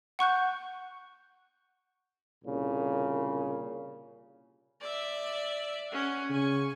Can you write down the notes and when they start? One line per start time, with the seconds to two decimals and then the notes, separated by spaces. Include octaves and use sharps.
0.19 F#5 C#6 F#6 G6
2.44 C2 A#2 C#3
4.81 D5 E5
5.90 C#4 F#5
6.30 C#3 G#5 C#6